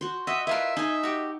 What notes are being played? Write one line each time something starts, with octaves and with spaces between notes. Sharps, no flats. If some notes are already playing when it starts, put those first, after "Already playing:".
F#4 C5
F#4 D#5 E5
E4 F4 A#4 B4 E5
D#4 G#4 G#5
F#4 G4